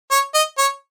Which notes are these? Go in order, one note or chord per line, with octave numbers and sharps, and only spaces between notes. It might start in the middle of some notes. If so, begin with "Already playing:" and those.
C#5
D#5
C#5